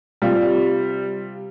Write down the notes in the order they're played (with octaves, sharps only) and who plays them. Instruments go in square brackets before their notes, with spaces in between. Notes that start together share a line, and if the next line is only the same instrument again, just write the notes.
[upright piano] C3 F4 [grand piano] G3